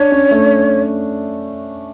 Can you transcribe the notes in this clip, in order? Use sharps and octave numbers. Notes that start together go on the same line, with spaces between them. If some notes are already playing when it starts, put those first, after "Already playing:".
Already playing: D4 C#5
C#4
A3